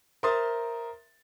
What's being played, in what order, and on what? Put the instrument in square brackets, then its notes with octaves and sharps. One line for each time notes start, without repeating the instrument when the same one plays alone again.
[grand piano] A#4 C5 E5 C6 D#6 A6